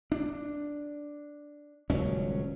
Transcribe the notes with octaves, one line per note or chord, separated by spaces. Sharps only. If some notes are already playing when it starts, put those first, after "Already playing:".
D4
D#1 C#2 F#3 C#4